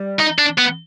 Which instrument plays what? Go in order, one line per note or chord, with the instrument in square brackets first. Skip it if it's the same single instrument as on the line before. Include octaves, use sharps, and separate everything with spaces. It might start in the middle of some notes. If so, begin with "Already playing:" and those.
Already playing: [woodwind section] G3
[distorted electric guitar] D#4
D4
B3